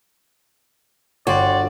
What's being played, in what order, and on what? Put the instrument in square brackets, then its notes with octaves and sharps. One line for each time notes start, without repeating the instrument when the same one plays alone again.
[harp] G1 [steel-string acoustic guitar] F#4 [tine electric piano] C#5 G5 C6 [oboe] D5